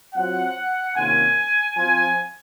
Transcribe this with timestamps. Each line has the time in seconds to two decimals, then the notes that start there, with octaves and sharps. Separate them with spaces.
0.14 F#3 C4 F4 F#5
0.95 C3 D#3 A#3 C#4 F4 G#5
1.76 F3 C4 F4 G#5